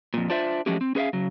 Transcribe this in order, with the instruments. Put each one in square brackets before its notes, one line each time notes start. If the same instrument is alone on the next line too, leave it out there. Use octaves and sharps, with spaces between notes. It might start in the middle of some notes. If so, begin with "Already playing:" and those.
[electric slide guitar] F2 A#2
D4 F4 C5 D5 E5
F3 F#3 G#3 A3 C#4 G4
C4
C#4 G#4 B4 C5 E5 F5
C#3 F#3